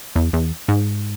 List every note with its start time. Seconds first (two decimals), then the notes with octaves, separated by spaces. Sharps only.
0.16 E2
0.33 E2
0.68 G#2